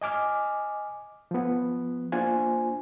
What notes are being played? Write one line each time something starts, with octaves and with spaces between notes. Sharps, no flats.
D#5 G#5 D6 F6
F3 B3
A#3 D4 F4 C5 G#5